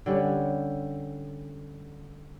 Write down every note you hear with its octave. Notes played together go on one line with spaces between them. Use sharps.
D3 G3 C#4